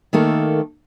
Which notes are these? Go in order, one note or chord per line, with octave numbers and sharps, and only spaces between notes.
D#3 A3 A#3 A4